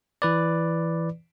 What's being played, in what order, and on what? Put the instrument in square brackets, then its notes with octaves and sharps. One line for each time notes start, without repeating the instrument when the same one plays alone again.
[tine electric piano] E3 B4 D5